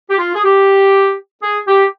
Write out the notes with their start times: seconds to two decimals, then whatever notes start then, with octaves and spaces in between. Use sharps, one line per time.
0.10 G4
0.18 F4
0.35 G#4
0.44 G4
1.42 G#4
1.67 G4